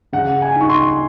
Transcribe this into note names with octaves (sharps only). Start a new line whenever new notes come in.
C#3 F#5
G#5
D#4
C#6
C6